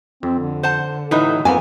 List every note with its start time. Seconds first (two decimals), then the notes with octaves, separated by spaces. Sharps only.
0.23 F2 C4
0.39 D3
0.63 C5 F#5 A5
1.11 A2 E3 F#3 D#4 B4
1.45 F2 A#3 B3 G#5